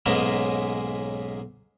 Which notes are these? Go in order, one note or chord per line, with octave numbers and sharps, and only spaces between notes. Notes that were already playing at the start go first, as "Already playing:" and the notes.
B1 G#2 C#3 G#3 A#3 B3